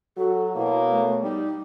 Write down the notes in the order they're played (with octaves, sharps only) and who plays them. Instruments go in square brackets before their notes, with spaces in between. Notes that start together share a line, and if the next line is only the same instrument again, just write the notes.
[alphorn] F#3 [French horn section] F#4 [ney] A4
[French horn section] B2 C#5 [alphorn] A#3 [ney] E4
[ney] A3
[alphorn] G3 [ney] D#4